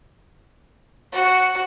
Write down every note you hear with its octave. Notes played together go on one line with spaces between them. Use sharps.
F#4